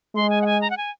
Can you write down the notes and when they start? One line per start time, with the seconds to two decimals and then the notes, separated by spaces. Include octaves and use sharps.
0.15 G#3 C6
0.30 G#5
0.42 F#5
0.46 G#5
0.61 A#5
0.70 F#5
0.77 G#5